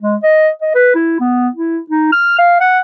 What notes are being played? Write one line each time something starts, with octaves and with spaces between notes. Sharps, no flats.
G#3
D#5
D#5
B4
E4
B3
E4
D#4
F6
F5
F#5